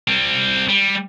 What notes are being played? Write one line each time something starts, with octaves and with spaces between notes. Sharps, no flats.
G3 C4
G3